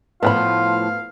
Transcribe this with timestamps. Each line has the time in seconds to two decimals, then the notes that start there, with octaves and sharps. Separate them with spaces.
0.23 A2 F3 B3 F4 F5 G5 B5